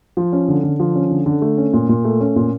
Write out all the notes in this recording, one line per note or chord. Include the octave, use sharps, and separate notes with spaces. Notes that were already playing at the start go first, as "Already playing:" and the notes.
F3
C#4
D3
D3
F3
C#4
D3
D3
A3
C#4
A#2
A#2
A3
C#4
A#2